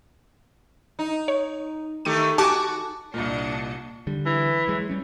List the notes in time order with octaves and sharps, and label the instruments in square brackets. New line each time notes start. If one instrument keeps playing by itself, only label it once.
[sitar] D#4
[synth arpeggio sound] C#5
[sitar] D#3 A3 G4 [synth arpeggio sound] D#7
[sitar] F#4 [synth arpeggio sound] G4 G#5 [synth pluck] A5 D6
[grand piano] C2 A#2 [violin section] D4 D#5 C#7
[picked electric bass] D3 G3
[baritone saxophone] E3
[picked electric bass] F#3 G#3
G3 C#4